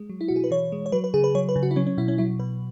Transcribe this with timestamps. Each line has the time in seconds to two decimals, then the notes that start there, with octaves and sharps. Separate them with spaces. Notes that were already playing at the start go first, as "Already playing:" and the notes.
Already playing: G#3
0.09 F#3
0.21 E4
0.28 B2 F#4
0.36 G#4
0.44 B4
0.51 E3 C#5
0.72 G#3
0.86 C#5
0.92 F#3 B4
1.04 B4
1.14 C#3 G#4
1.24 B4
1.35 F#3 C#5
1.49 B4
1.56 C#3
1.63 F#4
1.71 E4
1.76 F#3 C#4
1.87 C#4
1.97 B2 E4
2.08 C#4
2.18 F#3 E4
2.39 B2 B4